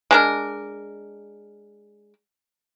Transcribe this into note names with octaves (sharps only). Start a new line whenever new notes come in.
G#3 D4 A#4